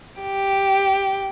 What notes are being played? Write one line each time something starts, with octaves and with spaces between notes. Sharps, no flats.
G4